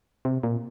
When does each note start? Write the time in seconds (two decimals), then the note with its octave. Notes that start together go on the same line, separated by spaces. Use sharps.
0.25 C3
0.43 A#2